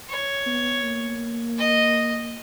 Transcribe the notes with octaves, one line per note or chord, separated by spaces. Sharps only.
C#5
B3
A#3
D#5